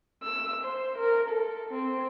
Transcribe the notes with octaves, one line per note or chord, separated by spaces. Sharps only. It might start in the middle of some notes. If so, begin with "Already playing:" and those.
E6
C5
A#4
A4
C4